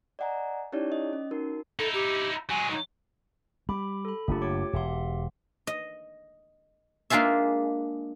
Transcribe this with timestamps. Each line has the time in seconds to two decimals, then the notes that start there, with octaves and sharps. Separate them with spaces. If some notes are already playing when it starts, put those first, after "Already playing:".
0.19 D5 D#5 F#5 G#5 A#5
0.72 C#4 D#4 E4 G4 C#5 D5
0.92 D#5
1.13 C#4
1.31 D#4 F#4 A#4
1.79 D#4 E4 A4
1.94 G4
2.50 F#3 G#3 G#5
2.71 D#4
3.69 G3 B5 D6
4.05 A4 B5
4.28 F#1 A3 A#3 D4 F4 G4
4.42 G4 C#5 D6
4.73 E1 G4 E5 C6
5.67 D#5
7.10 G#3 A#3 D4 F4 G#4 E5